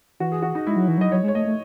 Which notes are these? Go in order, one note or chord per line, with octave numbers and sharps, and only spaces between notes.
E3 F#4
G#4
F#4
D#4
G#3 E4
F#3
E3
F#3 D#5
F#3 C#5
G#3
C#5
A3 D#5
A3